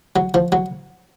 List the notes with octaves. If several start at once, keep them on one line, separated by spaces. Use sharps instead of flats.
F#3
F3
F#3